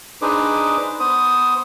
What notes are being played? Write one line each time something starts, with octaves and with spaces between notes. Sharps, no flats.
D4 D#4 G#4 B4 C5 D6
B3 C5 D#6